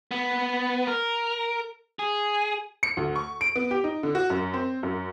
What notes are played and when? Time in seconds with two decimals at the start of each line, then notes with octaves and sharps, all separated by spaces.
0.11 B3
0.88 A#4
1.99 G#4
2.83 C#7
2.97 D2
3.16 C#6
3.41 D7
3.56 B3
3.71 G4
3.84 D#4
4.03 D3
4.15 F#4
4.30 F#2
4.54 C4
4.83 F#2